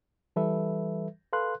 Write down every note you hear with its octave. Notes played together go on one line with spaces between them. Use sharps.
E3 G3 A4 B4 E5
A4 B4 F5 C6 F#6